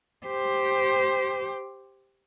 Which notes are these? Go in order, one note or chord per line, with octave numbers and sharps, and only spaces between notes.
G4 C5